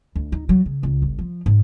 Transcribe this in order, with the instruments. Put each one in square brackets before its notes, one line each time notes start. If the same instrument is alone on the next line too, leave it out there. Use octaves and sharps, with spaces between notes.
[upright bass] D2
D#4
F#3
C#3
C#2
G1
F3
G#2